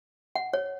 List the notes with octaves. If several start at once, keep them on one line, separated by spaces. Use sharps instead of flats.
F#5
C#5